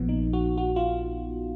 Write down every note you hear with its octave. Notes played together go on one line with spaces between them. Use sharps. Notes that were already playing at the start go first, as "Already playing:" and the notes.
Already playing: A#1 A#2 F3 B3
D#4
F#4
F#4
F4